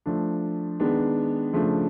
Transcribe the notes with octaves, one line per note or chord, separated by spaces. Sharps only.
F3 A3 D4
D#3 G#3 B3 D4
C#3 F3 A3 D4